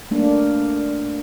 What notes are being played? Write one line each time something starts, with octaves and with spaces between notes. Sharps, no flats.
A3 A#3 D4